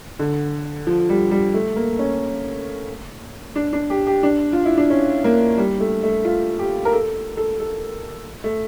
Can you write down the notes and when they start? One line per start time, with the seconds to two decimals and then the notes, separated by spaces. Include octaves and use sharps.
0.19 D3
0.87 F3
1.09 G3
1.31 G3
1.54 A3
1.76 A#3
1.99 C#4
3.56 D4
3.73 D4
3.90 G4
4.07 G4
4.23 D4
4.53 F4
4.65 E4
4.78 D4
4.90 C#4
5.24 A#3
5.57 G3
5.80 A3
6.03 A3
6.25 F4
6.59 G4
6.85 A#4
6.93 A4
7.37 A4
7.60 A4
8.44 A3